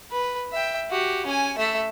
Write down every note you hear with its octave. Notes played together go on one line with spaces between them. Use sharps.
B4
E5 G5
F#4 G4
C#4 G#5
A3 E5